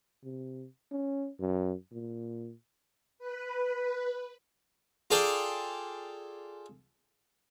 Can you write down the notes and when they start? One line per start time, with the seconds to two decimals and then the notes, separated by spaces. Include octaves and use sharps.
0.24 C3
0.92 C#4
1.40 F#2
1.92 A#2
3.19 B4
5.11 F4 G#4 A4 D5 G5